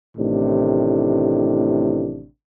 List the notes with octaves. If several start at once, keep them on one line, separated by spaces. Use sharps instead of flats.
A1 A2 C3 D#3 D4